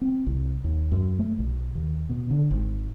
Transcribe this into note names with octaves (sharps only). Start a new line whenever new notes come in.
C4
C2
D#2
F#2
A3
B1
D#2
B2
D3
G#1